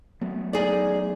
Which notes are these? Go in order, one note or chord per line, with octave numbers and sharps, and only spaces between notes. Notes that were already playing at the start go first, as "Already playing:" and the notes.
F#3 A3 B3
D#4 G#4 D5